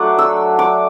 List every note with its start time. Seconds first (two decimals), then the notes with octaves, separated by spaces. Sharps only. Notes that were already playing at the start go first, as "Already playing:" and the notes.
Already playing: F#3 A3 D4 F#5 D6
0.19 E6
0.59 D6